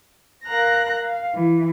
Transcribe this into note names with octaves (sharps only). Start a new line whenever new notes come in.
A#4 F5 A#5 F#6 A#6
F5
E3